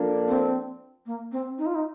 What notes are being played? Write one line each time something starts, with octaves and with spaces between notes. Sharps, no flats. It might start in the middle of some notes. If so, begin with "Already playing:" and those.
Already playing: F3 A#3 D4 A4
C4
A#3
C4
D#4
F4
D#4